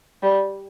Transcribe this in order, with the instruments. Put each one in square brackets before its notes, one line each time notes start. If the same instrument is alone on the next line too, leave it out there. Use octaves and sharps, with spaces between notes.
[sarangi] G3